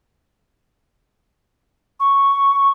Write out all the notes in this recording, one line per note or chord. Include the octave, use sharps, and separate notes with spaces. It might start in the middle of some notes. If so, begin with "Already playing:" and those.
C#6